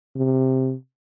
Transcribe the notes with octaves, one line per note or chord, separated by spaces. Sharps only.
C3